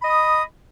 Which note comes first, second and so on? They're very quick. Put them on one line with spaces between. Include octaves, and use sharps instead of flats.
B5 D#5 D#6